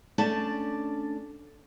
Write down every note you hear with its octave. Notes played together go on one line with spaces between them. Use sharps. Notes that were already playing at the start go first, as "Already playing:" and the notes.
A3 C#4 D4 D5 A5